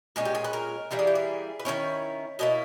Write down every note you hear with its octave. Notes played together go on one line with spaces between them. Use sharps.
A#2 G#3 C#4
G4
G#4
B4
A#4
E3 G3 A#3 E4 A#4
G#4
G4
G#4
B4
D#3 G3 C#4 E4 C#5
B2 A#3 E4 D#5